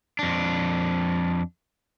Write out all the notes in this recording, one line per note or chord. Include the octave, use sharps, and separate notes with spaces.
F2 D4